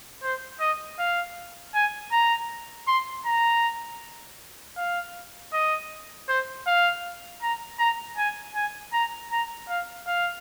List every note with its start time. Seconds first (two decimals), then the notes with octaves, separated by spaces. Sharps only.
0.23 C5
0.61 D#5
0.99 F5
1.74 G#5
2.12 A#5
2.88 C6
3.26 A#5
4.77 F5
5.53 D#5
6.29 C5
6.67 F5
7.42 A#5
7.79 A#5
8.17 G#5
8.55 G#5
8.93 A#5
9.31 A#5
9.69 F5
10.07 F5